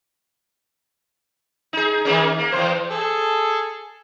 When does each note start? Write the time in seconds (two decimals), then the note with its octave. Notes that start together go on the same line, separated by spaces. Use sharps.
1.73 D#4 G#4
2.05 D#3 A#3 C#4
2.39 A#3
2.52 E2 E3 C5
2.90 G#4 A4